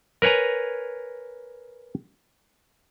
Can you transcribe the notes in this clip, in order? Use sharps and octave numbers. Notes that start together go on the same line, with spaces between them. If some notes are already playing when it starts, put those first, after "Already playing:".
A#4 B4 C#5 G#5 A#5